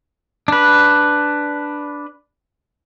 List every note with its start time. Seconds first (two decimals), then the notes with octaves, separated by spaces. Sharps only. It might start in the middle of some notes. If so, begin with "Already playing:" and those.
0.48 D4 B4